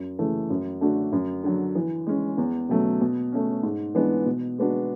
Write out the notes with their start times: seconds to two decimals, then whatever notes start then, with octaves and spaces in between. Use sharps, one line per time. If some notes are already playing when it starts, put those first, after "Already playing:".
Already playing: F#2
0.19 C#3 E3 A3
0.50 F#2
0.81 D3 A3 D4 F#4
1.12 F#2
1.43 D3 F#3
1.75 E3
2.07 G#3 C#4
2.38 E2
2.69 B2 F#3 A3 C#4
3.01 B2
3.32 A3 C#4
3.63 G#2
3.95 E3 G#3 B3 D4
4.26 B2
4.58 G#3 B3 D4 F#4